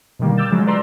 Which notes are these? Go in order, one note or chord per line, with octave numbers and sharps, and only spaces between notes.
B2 D3 D#3 G3 A#3
D6 E6 F6 G6 A6 E7
C#3 F3 F#3 G#3
A4 B4 D5 A#5 C6 E6